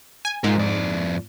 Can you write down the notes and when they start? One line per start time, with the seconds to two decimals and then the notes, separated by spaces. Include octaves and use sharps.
0.25 G#5
0.44 G#2 F4 A#4
0.57 F2 D5